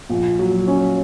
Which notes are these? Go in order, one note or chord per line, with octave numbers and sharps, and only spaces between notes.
A#1
F#3
C#4